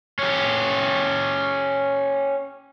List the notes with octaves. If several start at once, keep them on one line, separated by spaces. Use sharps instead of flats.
C#4 G4